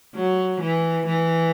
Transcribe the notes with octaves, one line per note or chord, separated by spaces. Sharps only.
F#3
E3
E3